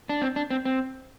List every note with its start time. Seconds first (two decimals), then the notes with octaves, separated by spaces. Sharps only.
0.09 D4
0.22 C4
0.36 D4
0.50 C4
0.65 C4